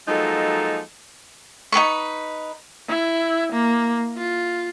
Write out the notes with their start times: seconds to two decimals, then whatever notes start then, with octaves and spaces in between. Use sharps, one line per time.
0.08 F3 F#3 G#3 A#3 D#4 A4
1.72 D#4 G#4 B4 C#6
2.89 E4
3.52 A#3
4.17 F4